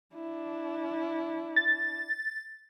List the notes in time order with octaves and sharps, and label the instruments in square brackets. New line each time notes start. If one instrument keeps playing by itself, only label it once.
[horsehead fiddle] D4 E4
[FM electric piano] A6